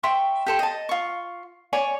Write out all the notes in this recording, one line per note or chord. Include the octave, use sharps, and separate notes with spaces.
E5 G5 C6 C#6
G4 A4 C5
D#5 A5
F4 C#6
C#5 D5 G#5